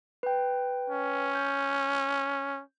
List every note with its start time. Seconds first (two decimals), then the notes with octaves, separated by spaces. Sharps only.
0.23 B4 G5
0.90 C#4
1.35 G6